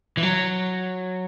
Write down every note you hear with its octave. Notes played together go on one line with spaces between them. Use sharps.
E3
F#3